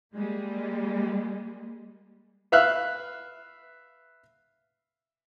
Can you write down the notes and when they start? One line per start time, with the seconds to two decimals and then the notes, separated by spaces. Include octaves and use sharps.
0.15 G3 G#3 A#3
2.52 B4 E5 F5 F6 F#6